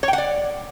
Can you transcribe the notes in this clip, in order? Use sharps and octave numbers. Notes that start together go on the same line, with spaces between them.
C#5
G5
F#5
D5